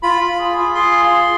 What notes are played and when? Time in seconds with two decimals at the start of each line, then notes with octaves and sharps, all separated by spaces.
0.03 F4 B5
0.21 F4
0.39 G#4
0.57 F4
0.75 G#4 C6